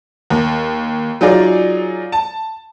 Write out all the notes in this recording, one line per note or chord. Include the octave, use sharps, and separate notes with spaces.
D#2
F#3 D#4 F4 G#4 D5
A5